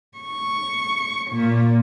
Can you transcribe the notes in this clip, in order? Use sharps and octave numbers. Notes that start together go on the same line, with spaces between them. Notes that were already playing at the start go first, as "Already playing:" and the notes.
C#6
A#2